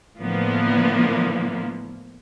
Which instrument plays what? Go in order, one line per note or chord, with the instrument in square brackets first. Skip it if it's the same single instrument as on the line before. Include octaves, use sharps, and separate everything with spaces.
[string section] A2 D3 E3 F3 A#3 B3